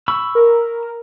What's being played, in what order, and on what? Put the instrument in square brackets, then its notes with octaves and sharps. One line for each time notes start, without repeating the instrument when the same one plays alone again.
[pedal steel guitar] B5 C#6 E6
[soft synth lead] A#4